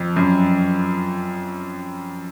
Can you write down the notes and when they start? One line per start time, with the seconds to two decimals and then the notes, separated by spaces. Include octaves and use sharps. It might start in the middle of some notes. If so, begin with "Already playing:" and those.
Already playing: F2
0.16 F#2